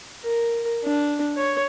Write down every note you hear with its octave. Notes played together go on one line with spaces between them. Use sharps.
A#4
D4
C#5